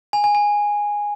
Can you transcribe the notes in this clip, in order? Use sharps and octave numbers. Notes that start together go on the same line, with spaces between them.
G#5
G#5
G#5